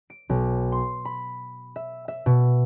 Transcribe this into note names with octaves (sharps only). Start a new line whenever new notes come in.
D7
B1
C6
B5
E5
E5
B2